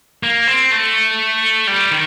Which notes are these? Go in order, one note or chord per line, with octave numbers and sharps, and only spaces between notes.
A#3
C4
A3
G3
D#3